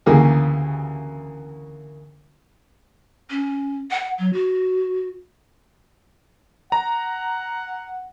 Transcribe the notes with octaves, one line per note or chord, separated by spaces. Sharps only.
D2 C#3 E3 A#3 G4 G#4
C#4
F#5
F#3
F#4
F#5 A#5